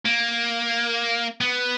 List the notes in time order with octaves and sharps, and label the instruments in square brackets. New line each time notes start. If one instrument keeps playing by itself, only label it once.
[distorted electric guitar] A#3
B3